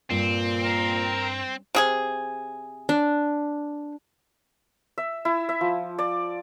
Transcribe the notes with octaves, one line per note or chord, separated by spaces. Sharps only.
G2 A#2 C4
A#4
C3 G#4 G#5
D4
E5
E4
E5
F3
D5